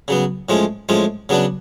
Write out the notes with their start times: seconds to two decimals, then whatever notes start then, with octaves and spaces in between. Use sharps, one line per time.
0.08 C#3 F#3 B3
0.49 A2 F3 G#3 C#4
0.89 A2 F3 G#3 C#4
1.29 C#3 F#3 B3 D4